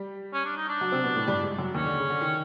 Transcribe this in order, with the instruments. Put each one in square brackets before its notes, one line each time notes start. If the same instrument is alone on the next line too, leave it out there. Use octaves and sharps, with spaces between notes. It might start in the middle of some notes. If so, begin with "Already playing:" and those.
Already playing: [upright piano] G3 G4
[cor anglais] C#4
D4
D#4
D4
[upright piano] F#3 F#4
C3 C4
B2 B3
A2 A3
G2 G3
G#2 G#3
F#2 F#3
[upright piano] D#2 D#3 [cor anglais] C#4
[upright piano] D3
C#3
D3
D#3